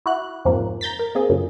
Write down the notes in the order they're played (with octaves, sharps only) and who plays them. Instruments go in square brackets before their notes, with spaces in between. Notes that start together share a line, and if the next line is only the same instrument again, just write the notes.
[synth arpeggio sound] E4 F#4 F#6
F2 G#2 C3 F3 A#3
A#5 G6 A6 B6
A#4
A#3 C4 G#4
F#2 A#2 C#3